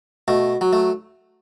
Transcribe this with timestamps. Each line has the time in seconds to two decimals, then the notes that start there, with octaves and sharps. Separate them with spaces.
0.28 B2 A3
0.61 F#3
0.73 A3